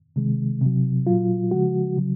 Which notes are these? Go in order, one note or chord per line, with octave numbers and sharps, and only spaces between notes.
C3 D#3 G#3
C3 F#3
A#2 F#3 F4
C#3 F3 G#3 F#4
C#3 F#3